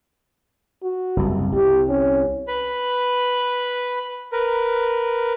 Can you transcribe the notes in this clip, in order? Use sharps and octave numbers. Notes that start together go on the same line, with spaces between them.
F#4
F#1 C2
C2 G4
C#4
B4 B5
A#4 B4